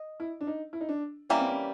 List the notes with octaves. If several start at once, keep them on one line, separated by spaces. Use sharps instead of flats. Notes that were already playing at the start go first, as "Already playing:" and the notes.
Already playing: D#5
E4
D4
D#4
E4
D#4
D4
E3 G3 A#3 C#4
C4
C#4